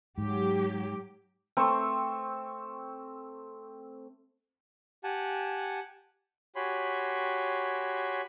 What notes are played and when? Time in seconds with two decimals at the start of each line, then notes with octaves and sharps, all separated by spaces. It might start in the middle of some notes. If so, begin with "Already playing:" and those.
0.18 G#2 F#3 G4
1.57 A3 C4 C6 C#6
5.04 G4 F#5 G#5 A5
6.56 F#4 G4 C#5 G#5 B5 C6